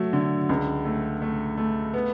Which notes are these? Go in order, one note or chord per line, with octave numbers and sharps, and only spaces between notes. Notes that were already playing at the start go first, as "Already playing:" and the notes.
Already playing: F#3 A3
D3
C#2
A3
A3
A3
B3